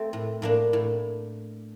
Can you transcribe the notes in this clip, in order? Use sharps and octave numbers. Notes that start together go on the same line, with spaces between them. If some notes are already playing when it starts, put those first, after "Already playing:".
Already playing: A3 C4
A2
A2 A#3 D4
A2